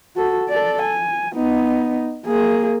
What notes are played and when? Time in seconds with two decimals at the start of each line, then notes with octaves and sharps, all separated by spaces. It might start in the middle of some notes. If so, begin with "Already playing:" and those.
0.16 F#4 A4
0.49 A4 D5
0.82 G#5
1.34 B3 D#4
2.26 A#3 G#4